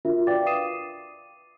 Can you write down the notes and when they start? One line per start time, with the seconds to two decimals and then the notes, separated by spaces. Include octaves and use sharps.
0.05 D4 F4 F#4 A#4 E5
0.27 B4 D5 F5 G5 D6 A6
0.46 D6 D#6 C7 D#7 E7